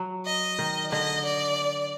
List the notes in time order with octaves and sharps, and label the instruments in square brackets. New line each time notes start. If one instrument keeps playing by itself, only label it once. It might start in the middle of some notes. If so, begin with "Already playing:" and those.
Already playing: [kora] F#3
[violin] D#5
[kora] D#3
[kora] D3 [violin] D#5
[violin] D5